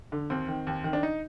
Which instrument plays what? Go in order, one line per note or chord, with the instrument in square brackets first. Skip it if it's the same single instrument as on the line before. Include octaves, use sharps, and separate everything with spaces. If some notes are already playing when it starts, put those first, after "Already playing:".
[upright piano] D3
D#2 C4
D#3
D#2
D#3
D4
D#4